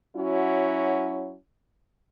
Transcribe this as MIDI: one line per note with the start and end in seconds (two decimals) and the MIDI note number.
0.16 1.34 54
0.16 1.34 61
0.16 1.34 64
0.16 1.34 66